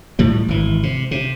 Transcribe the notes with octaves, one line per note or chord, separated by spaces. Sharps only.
A2 F3 G3
G#1 E3
C3
C3